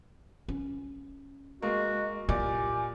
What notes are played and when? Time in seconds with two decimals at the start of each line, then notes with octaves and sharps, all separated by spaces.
0.48 C#4
1.62 G#3 A#3 F#4 D#5
2.29 A#2 E4 G4 D5 G#5